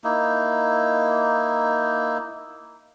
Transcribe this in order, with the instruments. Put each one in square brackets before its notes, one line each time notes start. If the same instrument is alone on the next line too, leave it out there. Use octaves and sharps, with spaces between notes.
[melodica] A#3 D#4 E4